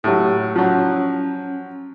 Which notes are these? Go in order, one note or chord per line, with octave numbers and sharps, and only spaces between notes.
A2 F#3 G4
F3 F#3 C#4